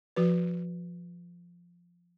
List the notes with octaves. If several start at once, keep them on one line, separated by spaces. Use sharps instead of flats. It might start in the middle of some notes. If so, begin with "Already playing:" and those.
F3 F#4 B4